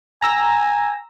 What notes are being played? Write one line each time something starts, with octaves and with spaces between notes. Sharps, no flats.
G#5 A#5 E6 A#6